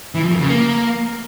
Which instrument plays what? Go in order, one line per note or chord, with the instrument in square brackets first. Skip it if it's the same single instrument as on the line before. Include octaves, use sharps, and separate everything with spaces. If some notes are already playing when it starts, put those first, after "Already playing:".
[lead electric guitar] E3
F3
F2
C#3
A#3